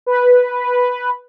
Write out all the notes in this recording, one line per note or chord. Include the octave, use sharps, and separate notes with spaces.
B4